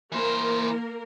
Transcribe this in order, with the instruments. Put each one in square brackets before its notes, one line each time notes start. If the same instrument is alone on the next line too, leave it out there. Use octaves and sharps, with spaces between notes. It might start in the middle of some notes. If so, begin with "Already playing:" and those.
[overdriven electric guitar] E3 C5 [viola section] A#3 A#4